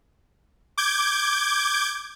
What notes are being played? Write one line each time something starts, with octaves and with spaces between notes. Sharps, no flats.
D6 G6 G#6